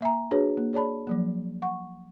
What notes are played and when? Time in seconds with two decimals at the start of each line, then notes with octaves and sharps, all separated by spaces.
0.01 A#3 E5 G#5 A#5
0.31 D4 F#4 G#4 B4 C#5
0.57 A#3
0.73 G#4 C#5 D5 A5 B5
1.07 F3 F#3 A#3
1.62 F#5 C#6